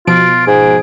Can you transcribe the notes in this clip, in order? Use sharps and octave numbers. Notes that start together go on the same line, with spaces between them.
B2 F3 F4 D7
G#2 G#4